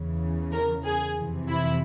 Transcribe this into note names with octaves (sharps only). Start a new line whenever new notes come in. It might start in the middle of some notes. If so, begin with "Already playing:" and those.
Already playing: E2 C#3 E3
A#4
G#4
F2 C3 E3
E4